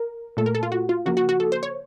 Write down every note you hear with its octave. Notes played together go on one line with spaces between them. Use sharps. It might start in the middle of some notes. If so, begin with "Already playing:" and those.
Already playing: A#4
A#2 A3 A4
A#4
A4
F4
F#4
F4
C#3 F3 A#3 F#4
F#4
F#4
A4
C5
C#5